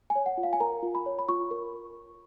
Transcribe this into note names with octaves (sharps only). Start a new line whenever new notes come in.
G#5
C#5
F#5
F4
F5
G#5
A#4 A#5
F4
B5
C#5
B5
F4 C#6
A#4